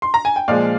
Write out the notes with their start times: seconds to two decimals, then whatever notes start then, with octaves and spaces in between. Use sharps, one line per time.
0.02 C6
0.14 A#5
0.25 G#5
0.36 G5
0.48 A#2 F3 G#3 D5 F5